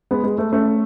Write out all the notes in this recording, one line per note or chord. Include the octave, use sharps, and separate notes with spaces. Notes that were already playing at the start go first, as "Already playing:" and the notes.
G#3 B3
G#3
A3
A3 C#4